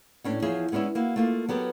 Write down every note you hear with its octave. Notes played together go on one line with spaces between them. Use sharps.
A2 C#4 D4
E2 F3 E4 G#4 C#5
G#3 B3 C#4 D4 E4
A#3 E4 F#4
A3 A#3 F4
F#3 B3 G4 A4 A#4